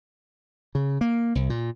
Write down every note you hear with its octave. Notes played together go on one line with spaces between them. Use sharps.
C#3
A#3
C2
A#2